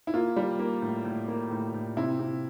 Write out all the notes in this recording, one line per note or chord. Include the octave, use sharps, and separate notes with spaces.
E4
A#3 F4
G3
A#3
A2
A2
A#3
A2
A2
C3 E4
C3